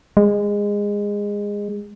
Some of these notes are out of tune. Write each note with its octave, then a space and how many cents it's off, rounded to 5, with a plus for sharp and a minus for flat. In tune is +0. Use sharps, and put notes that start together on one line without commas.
G#3 -20